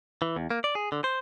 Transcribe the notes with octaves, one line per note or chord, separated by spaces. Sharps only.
E3
E2
A#3
D5
G#4
D3
C5